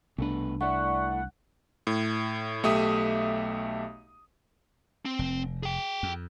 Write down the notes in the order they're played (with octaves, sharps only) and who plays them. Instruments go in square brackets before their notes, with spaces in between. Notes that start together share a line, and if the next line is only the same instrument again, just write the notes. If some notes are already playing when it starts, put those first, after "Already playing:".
[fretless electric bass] C2 D4 [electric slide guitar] B2 A3 B4
[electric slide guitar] A3 E4 [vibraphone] D5 C#6 [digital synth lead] F#5
[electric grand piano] A2
B1 A3 G4 E5 D#6
[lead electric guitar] C4
[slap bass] F1
[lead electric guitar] G#4 G5
[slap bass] F2